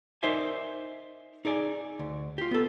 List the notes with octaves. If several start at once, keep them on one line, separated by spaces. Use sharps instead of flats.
D#4 A#4 C5 D5 E5 G#5
D#4 G#4 D5 G#5
D2
F4 G4
B3 A4